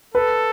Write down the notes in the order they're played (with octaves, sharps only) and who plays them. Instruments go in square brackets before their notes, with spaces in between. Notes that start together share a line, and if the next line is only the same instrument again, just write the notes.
[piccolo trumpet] A4 [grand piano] B4